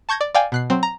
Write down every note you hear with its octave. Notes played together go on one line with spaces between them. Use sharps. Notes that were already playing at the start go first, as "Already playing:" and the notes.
A5 C#6 G6 G#6 A#6
D5
D5 F5 G5 G#5
B2 F#6 C7
F#3 C4
A#5